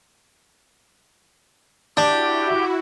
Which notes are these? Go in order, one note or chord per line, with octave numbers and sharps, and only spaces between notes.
D4 E4 F#4 G4 G6